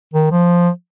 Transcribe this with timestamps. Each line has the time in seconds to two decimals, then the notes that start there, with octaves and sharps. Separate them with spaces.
0.14 D#3
0.32 F3